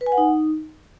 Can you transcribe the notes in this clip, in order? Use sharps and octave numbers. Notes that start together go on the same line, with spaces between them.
B4
G#5
F#5
D#4